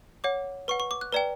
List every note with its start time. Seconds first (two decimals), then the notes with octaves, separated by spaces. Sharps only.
0.24 C#5 F#5 D6
0.68 B4 F#5 C#6
0.80 C#6
0.91 D6
1.01 F#6
1.13 B4 D5 G5 A#5